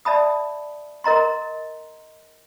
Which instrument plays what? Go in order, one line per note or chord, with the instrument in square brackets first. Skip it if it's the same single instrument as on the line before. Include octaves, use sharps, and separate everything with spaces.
[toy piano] D5 E5 A5 B5 D#6
A#4 D#5 A#5 C6